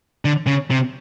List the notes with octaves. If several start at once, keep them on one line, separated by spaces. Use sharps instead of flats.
D3
C#3
C3